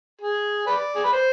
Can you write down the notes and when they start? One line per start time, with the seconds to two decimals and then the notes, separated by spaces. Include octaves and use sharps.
0.21 G#4
0.67 B4 D5
0.95 G#4
1.04 B4
1.13 C5